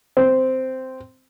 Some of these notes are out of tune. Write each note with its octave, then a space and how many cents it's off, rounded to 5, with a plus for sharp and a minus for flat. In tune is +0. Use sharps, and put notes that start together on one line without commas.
C4 -10